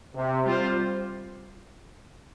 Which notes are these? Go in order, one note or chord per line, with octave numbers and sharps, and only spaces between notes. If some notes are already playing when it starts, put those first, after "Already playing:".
C3
G3 C4 F4 C5